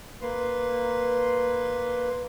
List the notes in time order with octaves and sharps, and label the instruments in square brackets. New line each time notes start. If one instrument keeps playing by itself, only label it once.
[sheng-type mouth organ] A#3 B4 C6